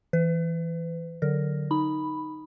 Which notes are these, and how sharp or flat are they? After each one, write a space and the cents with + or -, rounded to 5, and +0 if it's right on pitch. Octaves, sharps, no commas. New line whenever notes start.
E3 +0 B4 +40
D3 +0 F#3 +0 A#4 +0
D#4 +0 B5 +0